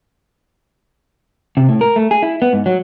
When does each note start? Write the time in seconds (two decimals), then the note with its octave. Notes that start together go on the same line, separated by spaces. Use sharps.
1.57 C3
1.69 A2
1.81 A#4
1.96 A3
2.11 G#4
2.23 E4
2.42 B3
2.53 G#2
2.66 F#3